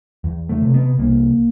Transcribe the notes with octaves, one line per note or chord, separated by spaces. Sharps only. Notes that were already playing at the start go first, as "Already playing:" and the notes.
E2
A3
C3
B3
C2 A#3